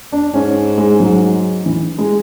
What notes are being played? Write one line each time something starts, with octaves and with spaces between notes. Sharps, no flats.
D4
G#2 C#4
G#3
F#3
E3
G#3